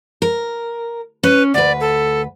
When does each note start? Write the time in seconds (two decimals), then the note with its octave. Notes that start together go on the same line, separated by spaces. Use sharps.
0.22 A#4
1.23 C#4 B4
1.54 D2 B4 D5
1.80 A4